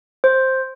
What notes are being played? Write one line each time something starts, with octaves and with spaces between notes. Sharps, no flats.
C5